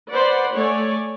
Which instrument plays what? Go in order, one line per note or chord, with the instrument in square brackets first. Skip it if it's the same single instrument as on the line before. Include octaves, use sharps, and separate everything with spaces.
[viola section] B4 C5 D5 F#5
A3 C#5 D5 G#5